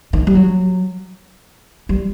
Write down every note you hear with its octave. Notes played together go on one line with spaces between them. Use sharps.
D#3
G3
F#3
G3